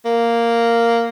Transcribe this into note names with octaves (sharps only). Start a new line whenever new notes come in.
A#3